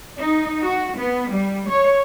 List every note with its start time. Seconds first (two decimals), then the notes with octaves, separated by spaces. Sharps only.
0.19 D#4
0.64 F#4
1.00 B3
1.32 G3
1.70 C#5